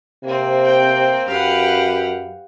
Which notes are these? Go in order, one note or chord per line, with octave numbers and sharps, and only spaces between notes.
C3 A#3 C4
G5
F#2 G4 B4 F5 F#5